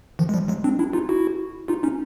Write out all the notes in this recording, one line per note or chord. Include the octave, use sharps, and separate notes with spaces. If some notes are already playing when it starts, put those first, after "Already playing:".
D#3 F3
G#3
F3 G3
F#3 G#3
C4 D4
D4 E4
D#4 F4
E4 F#4
D#4 F4
C#4 D#4